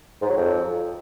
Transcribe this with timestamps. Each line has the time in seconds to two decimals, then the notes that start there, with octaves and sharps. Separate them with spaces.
0.21 G#2
0.29 F#3
0.37 F2